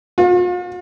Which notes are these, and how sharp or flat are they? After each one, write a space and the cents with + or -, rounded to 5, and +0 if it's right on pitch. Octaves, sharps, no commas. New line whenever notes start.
F4 +45